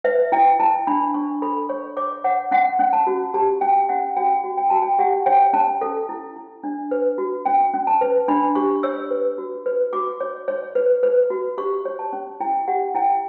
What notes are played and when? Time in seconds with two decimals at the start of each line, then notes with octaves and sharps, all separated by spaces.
0.04 B4 E5
0.32 E4 G5
0.60 E4 A5
0.87 D4 B5
1.14 D4 C#6
1.42 A4 B5
1.69 C#5 C#6
1.97 C#5 D6
2.24 C#5 F#5
2.51 C#4 F#5
2.79 C#4
2.93 A5
3.07 F#4
3.34 G4 A5
3.61 C#4 G5
3.89 C#4 F#5
4.16 F#4 G5
4.44 F#4
4.57 G5
4.70 F#4 A5
4.82 G5
4.99 G4 F#5
5.26 C#5 G5
5.53 C#4 A5
5.81 A4
6.09 E4
6.36 E4
6.64 D4
6.91 B4
7.18 F#4
7.45 C#4 G5
7.74 C#4
7.87 A5
8.01 B4
8.28 D4 B5
8.55 G4 C#6
8.83 C#5 E6
9.11 B4
9.38 F#4
9.66 B4
9.93 F#4 D6
10.20 C#5
10.48 C#5
10.75 B4
11.03 B4
11.30 F#4
11.58 G4 C#6
11.85 C#5
11.99 A5
12.13 C#4
12.40 E4 G5
12.68 G4 F#5
12.95 E4 G5